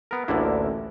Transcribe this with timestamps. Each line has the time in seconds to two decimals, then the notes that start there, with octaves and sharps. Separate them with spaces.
0.11 B3 A#4
0.28 A1 D2 D3 A#3 E4